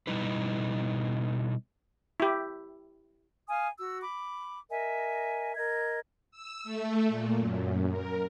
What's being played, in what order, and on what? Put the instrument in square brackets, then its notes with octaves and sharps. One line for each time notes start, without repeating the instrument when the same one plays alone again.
[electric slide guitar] B2 G3 D#4 E4 B4
[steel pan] E4 G4
[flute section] F5 G#5 D#6 F6
F#4 E6
B5 D6
A#4 D#5 E5 G#5
A#4 D#5 G#6
[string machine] E6
A3
A#2
F#2
A#4